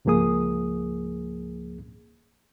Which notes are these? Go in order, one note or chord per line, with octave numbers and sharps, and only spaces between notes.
C#2 G#2 F3 A#3 G#4 D#6